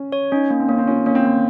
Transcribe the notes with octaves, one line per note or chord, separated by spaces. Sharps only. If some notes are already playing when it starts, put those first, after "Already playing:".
Already playing: C#4
C#5
C#4 D#4
A#3
C4
A#3 C#4
C4
C#4 F4
C4
A#3 C#4
C4
A#3